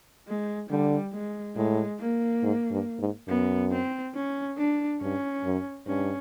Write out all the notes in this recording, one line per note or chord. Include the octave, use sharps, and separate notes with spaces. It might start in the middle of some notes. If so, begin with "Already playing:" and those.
G#3
D3 G3
G#3
A2 G#3
A#3
G#2
G2
G#2
F#2 B3
C4
C#4
D4
G2 C#4
F#2
G2 C#4